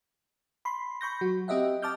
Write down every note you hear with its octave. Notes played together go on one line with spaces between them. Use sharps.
B5 C6
B5 C#6 G6 A#6
F#3 F#4
C4 G4 D#5 E5 F#5
D#5 A5 D6 F6 G6